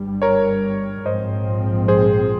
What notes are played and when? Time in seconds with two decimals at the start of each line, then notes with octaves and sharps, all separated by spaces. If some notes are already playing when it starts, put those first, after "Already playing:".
Already playing: G1 G2 G3
0.22 A#4 C#5
1.05 A#1 G#2 F3 G#3 C4 C5 D#5
1.88 G#4 C5